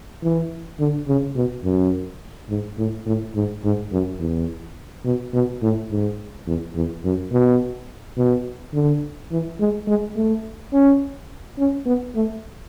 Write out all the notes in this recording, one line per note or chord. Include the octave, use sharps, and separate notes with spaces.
E3
D3
C#3
B2
F#2
G#2
A2
A2
G#2
G#2
F#2
E2
B2
B2
A2
G#2
E2
E2
F#2
B2
B2
D3
E3
G#3
G#3
A3
C#4
C#4
B3
A3